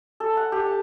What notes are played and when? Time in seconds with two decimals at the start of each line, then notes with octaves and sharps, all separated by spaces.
0.20 A4
0.37 F#5
0.52 G4
0.67 A5